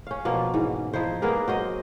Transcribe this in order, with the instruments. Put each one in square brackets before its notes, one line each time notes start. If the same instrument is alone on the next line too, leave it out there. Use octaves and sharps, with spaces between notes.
[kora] C#4 F5
B2 F3 A#3
G#2 E3
F3 D#4 E4 C5
A#3 B3 G#4 A#4
F#3 C5 D#5